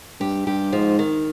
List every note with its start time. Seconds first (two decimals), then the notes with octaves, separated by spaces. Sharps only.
0.20 G2 G4
0.47 G2 G4
0.73 G#2 F3
0.99 D#3